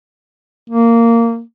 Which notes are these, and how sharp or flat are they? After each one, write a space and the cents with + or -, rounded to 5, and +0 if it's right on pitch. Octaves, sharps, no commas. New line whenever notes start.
A#3 -15